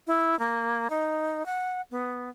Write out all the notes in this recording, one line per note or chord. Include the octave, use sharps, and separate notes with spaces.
E4
A#3
D#4
F#5
B3